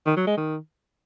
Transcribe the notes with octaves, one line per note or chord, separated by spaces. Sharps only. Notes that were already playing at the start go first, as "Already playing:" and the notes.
D#3
F#3
G#3
D#3